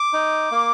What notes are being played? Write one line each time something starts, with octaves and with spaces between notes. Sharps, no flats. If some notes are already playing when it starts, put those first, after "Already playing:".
Already playing: D6
D#4
A#3